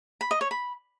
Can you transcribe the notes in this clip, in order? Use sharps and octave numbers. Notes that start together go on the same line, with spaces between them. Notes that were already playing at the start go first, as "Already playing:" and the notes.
B5
D#5
C#5
B5